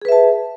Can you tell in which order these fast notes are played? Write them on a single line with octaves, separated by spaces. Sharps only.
G#4 B4 E5 A5